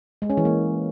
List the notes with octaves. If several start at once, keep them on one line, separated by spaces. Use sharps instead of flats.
G#3
C#4
E3
A#3